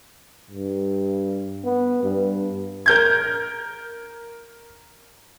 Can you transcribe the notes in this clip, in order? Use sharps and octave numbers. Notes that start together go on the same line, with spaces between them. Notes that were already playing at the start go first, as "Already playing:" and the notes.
G2
B3
G2
A#4 G6 G#6